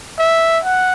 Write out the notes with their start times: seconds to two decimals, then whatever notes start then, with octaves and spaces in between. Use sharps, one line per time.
0.19 E5
0.64 F#5